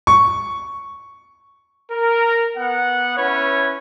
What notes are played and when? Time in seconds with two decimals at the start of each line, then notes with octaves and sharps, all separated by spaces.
0.07 C#6
1.92 A#4
2.57 B3 F#5
3.18 C#4 E4 B4 C#5